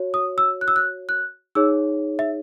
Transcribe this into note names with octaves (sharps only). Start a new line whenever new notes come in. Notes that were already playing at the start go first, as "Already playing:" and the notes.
Already playing: F#4 C#5
D#6
E6
F#6
E6
F#6
F#6
D#4 G#4 C#5 E6
E5